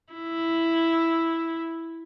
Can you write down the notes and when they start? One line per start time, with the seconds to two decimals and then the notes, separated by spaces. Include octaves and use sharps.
0.13 E4